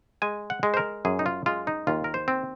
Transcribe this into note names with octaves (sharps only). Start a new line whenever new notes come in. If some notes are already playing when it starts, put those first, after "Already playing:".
G#3 G#5
F#5
G#3
C5
A#4
F#2 G#4
D#4
F4
G#3 F4
D#4
D#2 F4
A#4
C5
C4